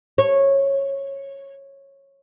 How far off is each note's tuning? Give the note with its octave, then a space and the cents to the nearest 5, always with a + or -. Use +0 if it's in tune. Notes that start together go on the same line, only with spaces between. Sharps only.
C#5 -15